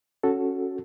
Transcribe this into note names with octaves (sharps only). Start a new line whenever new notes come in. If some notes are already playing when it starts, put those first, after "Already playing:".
C#4 F#4 A4